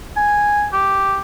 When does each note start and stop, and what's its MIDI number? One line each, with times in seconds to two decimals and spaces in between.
0.16 0.67 80
0.73 1.21 67